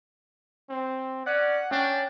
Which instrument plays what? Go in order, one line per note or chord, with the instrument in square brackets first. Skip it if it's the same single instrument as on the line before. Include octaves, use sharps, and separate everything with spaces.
[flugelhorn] C4
[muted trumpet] C#4 [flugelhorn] D5 [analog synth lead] F#5
[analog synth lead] C#4 [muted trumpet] D4 [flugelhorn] G5